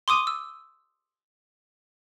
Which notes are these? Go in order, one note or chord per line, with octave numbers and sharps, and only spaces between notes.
C6 D6 D#6 D#7
E6